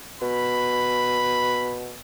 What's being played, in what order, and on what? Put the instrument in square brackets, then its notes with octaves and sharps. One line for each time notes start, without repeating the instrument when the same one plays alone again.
[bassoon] B2 [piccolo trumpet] B5